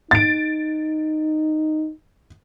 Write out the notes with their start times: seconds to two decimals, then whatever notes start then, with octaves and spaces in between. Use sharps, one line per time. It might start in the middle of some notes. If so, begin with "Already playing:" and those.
0.11 D#4 A6 D7